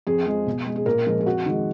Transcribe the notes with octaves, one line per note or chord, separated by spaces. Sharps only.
F2 G#4
F3 G#3
B2
G#3
G#4
A#2 A#4
F3 G#3
G#4
F2 F#4
D#3 G#3